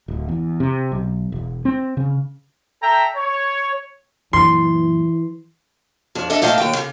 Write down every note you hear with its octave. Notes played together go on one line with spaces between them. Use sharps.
D1
E2
C3
B1
E1
C4
C#3
A4 E5 G5 A#5
C#5
F#2 A#2 E3 C6
F2 D4
D4 A4 D#5 E5
A#2 A3 D#5 F5 G5 A5
D#2 F3 G5
C#3